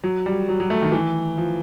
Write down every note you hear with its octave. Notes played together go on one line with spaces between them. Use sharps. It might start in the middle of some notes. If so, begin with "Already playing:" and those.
F#3
G3
F#3
F#3
A3
D#3
E3
F3